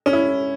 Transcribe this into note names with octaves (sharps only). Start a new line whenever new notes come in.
C#4
E4